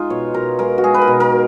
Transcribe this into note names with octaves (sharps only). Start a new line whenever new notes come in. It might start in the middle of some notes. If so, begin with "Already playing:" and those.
Already playing: G#3 D#4 F4
B2 C#5
B2 A#4
G#3 A#4
F#4
G#3 G#4
B4
A#4
B2
A#4
B2